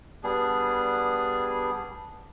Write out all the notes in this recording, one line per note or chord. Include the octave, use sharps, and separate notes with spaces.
G3 B3 D4 G#4